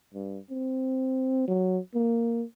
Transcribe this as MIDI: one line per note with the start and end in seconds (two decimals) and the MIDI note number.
0.14 0.38 43
0.50 1.45 60
1.48 1.79 54
1.95 2.44 58